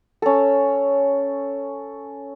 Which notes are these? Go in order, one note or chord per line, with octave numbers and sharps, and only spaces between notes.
C#4 A4